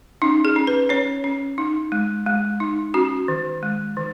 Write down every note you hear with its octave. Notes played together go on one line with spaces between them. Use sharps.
C#4 D#4
G#4
C#4
B4
C#4 C#5
C#4
D#4
G#3
G#3
D#4
C#4 F#4
D#3
G#3
D#3